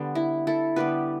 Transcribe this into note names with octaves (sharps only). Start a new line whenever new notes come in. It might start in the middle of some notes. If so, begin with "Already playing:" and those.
Already playing: D3 G3 B3
E4
E4 A4
D3 G3 B3 G4 B4